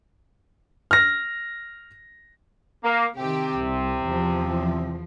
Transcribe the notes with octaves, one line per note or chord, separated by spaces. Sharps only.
F6 A#6
A#3
C3 D#3 G4
C2
E2 F3